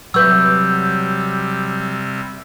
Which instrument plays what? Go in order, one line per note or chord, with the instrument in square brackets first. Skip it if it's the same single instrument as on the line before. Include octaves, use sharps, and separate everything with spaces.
[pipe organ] C3 G3 [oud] F#3 B4 E5 [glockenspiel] E6 G6